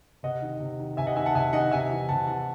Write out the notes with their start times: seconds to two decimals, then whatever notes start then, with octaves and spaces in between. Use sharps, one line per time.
0.23 C3 D#5 F#5
0.42 D#3
0.60 C3
0.80 D#3
0.97 C3 E5 G#5
1.07 D#5 F#5
1.16 D#3 E5 G#5
1.26 F#5 A5
1.35 C3 E5 G#5
1.53 D#3 D#5 F#5
1.71 C3 E5 G#5
1.91 E3
2.08 C3 F#5 A5
2.27 E3 F#5 A5